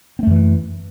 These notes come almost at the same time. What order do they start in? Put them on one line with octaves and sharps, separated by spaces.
C4 A3 F#2 E3